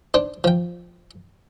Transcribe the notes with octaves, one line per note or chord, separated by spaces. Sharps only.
D4 C5
F3 G5